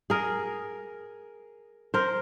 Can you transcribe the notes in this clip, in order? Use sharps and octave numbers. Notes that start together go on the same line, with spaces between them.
G#4 A#4
A#4 C5